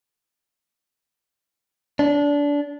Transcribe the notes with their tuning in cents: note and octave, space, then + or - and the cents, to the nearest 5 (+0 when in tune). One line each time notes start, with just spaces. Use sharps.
D4 -25